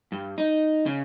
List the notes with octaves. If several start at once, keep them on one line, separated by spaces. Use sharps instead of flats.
G2
D#4
C#3